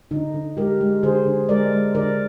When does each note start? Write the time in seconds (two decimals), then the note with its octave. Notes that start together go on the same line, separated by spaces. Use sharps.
0.11 D3 D#4
0.34 D3
0.57 G#3 G4 A#4
0.81 G#3
1.03 D3 G#4 C5
1.26 D3
1.49 G#3 A#4 D5
1.72 G#3
1.95 D3 A#4 D5